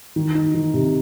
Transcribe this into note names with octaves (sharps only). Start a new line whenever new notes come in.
D#3
D#4
D#3
C3